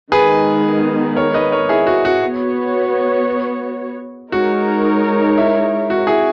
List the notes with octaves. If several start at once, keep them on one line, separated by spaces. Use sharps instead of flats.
D#3 G#3 B3 G#4 B4
A#4 C#5
B4 D#5
A#4 C#5
E4 G#4
F#4
F#4
B3 F#4 C#5
G#3 D#4 F#4 A#4 C#5
E4
F#4
E4 G#4